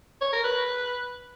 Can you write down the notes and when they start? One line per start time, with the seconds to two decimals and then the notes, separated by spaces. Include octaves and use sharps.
0.21 C#5
0.33 A#4
0.44 B4